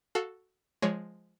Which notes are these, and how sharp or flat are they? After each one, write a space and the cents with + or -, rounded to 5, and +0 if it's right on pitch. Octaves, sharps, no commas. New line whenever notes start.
F#4 +0 A4 +0 F5 +15
F3 +0 G#3 +0 C#5 +20